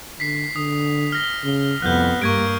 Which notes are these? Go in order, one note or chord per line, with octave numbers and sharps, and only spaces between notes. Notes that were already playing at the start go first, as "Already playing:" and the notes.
D3 B6 C7
D3 D#6
F6 A#6 G7
C#3
C2 F2 B3 F#6 G6
G2 G3 A#3 C#6 G#6 D7